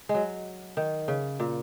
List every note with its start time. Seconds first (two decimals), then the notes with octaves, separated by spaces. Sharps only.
0.09 G#3
0.14 F#3
0.77 D#3
1.08 C#3
1.40 A#2